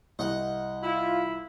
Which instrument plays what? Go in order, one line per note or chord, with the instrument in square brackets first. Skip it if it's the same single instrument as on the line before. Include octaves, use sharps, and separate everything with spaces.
[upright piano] C2 [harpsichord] D#5 F#5
[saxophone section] E4 [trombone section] F4